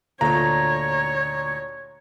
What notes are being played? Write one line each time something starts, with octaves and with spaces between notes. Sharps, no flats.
D2 A#2 C#5 A#5